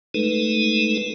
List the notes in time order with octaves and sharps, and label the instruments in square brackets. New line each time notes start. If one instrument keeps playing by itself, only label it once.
[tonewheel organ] G#3 A3 D#4 A4 B4